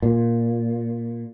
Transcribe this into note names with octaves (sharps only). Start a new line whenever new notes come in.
A#2